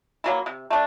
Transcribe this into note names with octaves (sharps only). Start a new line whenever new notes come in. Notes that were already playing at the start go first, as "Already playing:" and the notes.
E3 F#3 A#3
C3
A3 D4